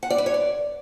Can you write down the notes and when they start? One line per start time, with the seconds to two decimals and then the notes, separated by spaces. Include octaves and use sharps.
0.03 F#5
0.10 D5
0.18 B4
0.26 C#5
0.34 D5